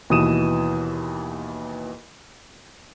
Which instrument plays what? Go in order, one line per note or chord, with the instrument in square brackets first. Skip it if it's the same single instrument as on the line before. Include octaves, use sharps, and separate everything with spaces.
[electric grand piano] D#2 B2 E3 D#6 D#7 E7